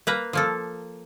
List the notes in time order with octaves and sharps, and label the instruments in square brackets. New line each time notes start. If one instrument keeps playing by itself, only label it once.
[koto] A#3 B4 A#5
F3 A#3 A4